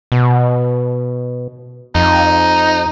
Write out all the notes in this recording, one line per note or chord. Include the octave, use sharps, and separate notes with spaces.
B2
F2 D#4